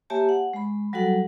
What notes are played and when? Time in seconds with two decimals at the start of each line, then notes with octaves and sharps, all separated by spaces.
0.10 A#3 G4 C#5 E5 G#5 A5
0.29 F#5
0.53 G#3 B5
0.93 F#3 G3 F#4 A4 F#5